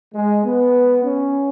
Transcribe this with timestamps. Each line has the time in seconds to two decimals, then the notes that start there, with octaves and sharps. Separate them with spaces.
0.14 G#3
0.44 B3
1.03 C#4